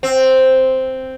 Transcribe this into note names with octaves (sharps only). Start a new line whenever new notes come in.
C4